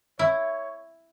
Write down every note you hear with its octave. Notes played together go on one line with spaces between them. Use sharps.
E4 C#5